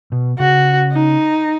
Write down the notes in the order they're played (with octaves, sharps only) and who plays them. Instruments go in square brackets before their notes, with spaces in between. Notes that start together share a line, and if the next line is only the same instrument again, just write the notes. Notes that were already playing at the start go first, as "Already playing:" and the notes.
[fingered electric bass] B2
[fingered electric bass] C#3 [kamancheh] F#4
[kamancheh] D#4